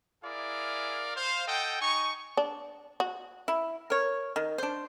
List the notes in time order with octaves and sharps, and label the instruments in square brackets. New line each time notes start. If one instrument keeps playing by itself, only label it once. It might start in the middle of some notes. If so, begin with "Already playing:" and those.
[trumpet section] E4 G#4 A#4 D5 F5
C5 F5
A4 D#5 F#5 G5
D#4 G#5 C#6
[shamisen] D4
F#4
[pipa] E4
A#4 C#5
D#3
D4 C5